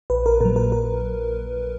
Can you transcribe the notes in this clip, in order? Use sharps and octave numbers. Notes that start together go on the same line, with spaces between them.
A#1 B4
A#4
A#2 F#3 A#4
A#4
A#4